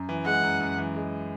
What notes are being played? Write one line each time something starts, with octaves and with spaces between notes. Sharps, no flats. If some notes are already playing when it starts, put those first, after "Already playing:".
Already playing: F#2
E3
G#3 F#5
F#2
F#2
E3
G#3